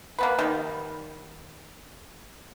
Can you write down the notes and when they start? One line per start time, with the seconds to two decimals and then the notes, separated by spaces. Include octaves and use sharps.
0.19 A#3 B3 B4
0.39 D#3 G3